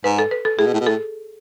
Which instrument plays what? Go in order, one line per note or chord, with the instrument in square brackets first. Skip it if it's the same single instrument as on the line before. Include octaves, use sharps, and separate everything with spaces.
[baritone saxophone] G#2 [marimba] B4
[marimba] A4
B4
A4
[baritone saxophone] A2 [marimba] G#4
[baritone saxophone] B2
A2
B2
[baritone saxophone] A2 [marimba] A4